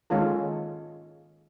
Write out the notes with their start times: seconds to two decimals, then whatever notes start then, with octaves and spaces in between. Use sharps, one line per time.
0.10 D#3 G#3 C#4 F4 A4